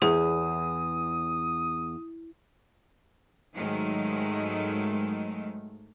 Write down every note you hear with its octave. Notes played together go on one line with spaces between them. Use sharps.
E2 G#4 D#6
G#2 D#3 F#3 G#3 A3